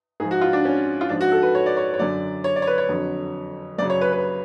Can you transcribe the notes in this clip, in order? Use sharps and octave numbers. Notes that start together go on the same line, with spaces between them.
G#2 F3 G#4
F#4
F4
D4
C#4
F4
G#2 F3 D4
F#4
A4
B4
C#5
D5
C#5
C#5
F#2 D3 F#3 D5
C#5
D5
C#5
B4
C#5
F2 D3 F#3
F#2 C#3 F#3 D5
C#5
B4
B4